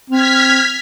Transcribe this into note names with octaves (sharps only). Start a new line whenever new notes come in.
C4 F6 G#6 B6